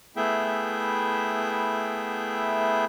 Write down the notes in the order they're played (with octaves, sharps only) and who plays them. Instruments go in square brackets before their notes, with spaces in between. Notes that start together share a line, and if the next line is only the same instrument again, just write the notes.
[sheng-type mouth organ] A3 B3 E4 G#4 E5 G5